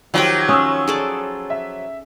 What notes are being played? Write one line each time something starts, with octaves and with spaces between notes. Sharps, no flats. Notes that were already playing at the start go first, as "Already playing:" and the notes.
D#3 F3 F#3 F4 G4 G5
C#4 D#6 E6
G#4 A4 D5
E5